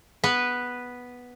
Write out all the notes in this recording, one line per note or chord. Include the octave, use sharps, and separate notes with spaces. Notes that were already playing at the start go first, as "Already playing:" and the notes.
B3 B4